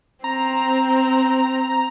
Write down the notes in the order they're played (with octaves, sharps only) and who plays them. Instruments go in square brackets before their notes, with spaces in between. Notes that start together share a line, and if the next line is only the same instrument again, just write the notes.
[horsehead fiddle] C4 [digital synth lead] A#5